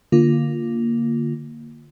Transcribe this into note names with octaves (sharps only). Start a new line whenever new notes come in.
D3 A#3 F4